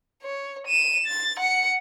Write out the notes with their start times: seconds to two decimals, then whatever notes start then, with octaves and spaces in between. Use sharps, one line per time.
0.23 C#5
0.67 D#7 E7
1.06 A6
1.40 F#5 C#7